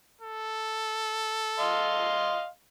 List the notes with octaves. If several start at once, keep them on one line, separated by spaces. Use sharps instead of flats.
A4
D#5 F5 C6